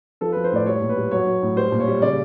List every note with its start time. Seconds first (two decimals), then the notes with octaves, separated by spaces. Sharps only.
0.21 F3 A4
0.32 B4
0.37 F3
0.44 C5
0.52 A2 D5
0.66 G3 C#5
0.81 A#2
0.89 B4
0.97 G3
1.11 F#3 C#5
1.27 F#3
1.42 A2
1.56 G3 C5
1.72 A#2
1.80 C#5
1.87 G3
2.02 C#3 D5